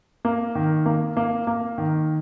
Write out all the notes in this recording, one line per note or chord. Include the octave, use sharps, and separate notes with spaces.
A#3
D#3
A#3
A#3
A#3
D#3